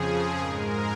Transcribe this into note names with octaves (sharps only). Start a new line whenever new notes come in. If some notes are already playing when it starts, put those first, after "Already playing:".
Already playing: F2 C#3 F3 G#4
G#2 G#3 A#4